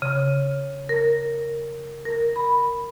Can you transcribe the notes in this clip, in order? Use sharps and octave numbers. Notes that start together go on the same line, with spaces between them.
C#3
A#4
A#4
B5